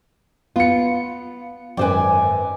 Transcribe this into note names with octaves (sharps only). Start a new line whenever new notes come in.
B3 F4 C#7
G#1 F#2 B4 C5 D5 G5 G#5